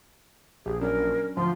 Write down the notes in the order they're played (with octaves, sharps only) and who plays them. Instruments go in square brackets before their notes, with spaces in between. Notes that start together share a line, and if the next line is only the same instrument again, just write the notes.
[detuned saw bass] A#1 [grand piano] G4 [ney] G#4
[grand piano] F#3 C#4 D4 [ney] A#4
[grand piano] D2 [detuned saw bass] F3 [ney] C6